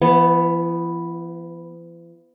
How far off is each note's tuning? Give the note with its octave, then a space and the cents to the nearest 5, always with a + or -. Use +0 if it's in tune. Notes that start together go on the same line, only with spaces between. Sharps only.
E3 +45 B3 +0